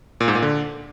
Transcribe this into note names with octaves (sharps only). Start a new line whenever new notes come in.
A#2
G#2
A#2
D3